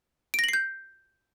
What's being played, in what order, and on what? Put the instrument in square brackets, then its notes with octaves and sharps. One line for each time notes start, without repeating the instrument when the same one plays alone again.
[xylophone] D7
A#6
F#7
C7
G6